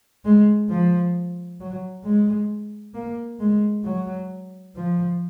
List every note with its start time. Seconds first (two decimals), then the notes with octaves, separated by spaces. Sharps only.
0.25 G#3
0.70 F3
1.60 F#3
2.04 G#3
2.94 A#3
3.40 G#3
3.84 F#3
4.75 F3